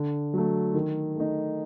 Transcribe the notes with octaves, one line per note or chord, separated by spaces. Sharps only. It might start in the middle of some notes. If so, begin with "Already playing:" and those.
Already playing: D3
F#3 A3
D#3
A3 D#4